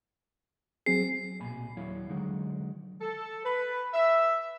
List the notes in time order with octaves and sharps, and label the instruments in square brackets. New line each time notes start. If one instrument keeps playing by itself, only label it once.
[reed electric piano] F#3 C4 G#4 [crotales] C7
[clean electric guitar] B1 A#2 G#5 B5
D#2 F#3 E4 C#5 F5
D3 D#3 F#3 G#3
[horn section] A4
B4
E5